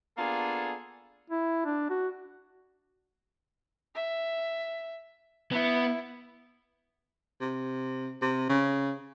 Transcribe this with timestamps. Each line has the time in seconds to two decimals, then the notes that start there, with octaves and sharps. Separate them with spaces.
0.17 A#3 B3 D4 F4 G#4 A4
1.30 E4
1.65 D4
1.90 F#4
3.95 E5
5.52 B3 E4
7.41 C3
8.22 C3
8.49 C#3